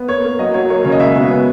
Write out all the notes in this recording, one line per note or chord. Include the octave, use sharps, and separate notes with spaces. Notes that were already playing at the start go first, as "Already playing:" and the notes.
Already playing: B3
A#3 C#5
A#3
F#3 D#5
F#3 C#5
A#3 C#5
C#3 C#5
D#5
G#3 E5
B2
B3